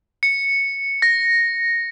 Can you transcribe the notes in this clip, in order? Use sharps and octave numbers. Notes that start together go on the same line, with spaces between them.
C#7
A#6